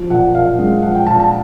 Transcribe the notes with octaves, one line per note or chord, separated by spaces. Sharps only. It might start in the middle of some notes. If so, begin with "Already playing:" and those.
Already playing: F3
A#2 F#5
A#2 F5
G#3
F3 F#5
G5
A#2 A5
A5